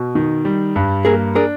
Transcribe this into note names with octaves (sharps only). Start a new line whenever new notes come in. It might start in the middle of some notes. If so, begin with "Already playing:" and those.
Already playing: B2
D#3
G3
G2
A#3 G#4 A#4
D4 G#4 A#4